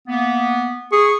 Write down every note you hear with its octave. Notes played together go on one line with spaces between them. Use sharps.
A#3 B3
G#4 C#6